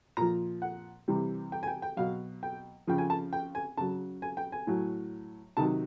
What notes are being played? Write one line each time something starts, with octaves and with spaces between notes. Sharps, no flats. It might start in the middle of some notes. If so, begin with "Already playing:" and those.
A#2 F3 A#5
F#5
C3 E3 G3
G5
G#5
G5
G5
B2 F#3 F5
G5
C#3 F3 G5
G#5
A5
G5
G#5
C#3 F#3 A5
G#5
G5
G#5
A2 F#3
C3 D#3 F#3 A5